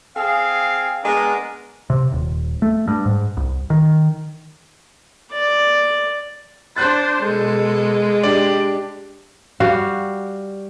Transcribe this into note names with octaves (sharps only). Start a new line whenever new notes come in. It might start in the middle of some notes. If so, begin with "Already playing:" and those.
C4 G#4 F5
G#3 B3 D4 A#4
C3
D#1
A3
G2
G#2
C2
D#3
D5
D4 C5 C6 F#6 A6
B2 G#3 A4
D4 G4 D5
G3 F#4 F5